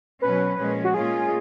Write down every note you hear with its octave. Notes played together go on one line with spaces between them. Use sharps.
B2 F#3 C#4 B4
A#2 F3 G#3 C#4
F#4
A#2 G#3 C#4 F4 G#4